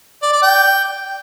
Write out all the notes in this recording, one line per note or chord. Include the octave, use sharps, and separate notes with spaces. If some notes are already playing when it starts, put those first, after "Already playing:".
D5
D5
G5